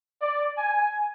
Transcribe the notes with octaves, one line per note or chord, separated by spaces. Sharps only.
D5
G#5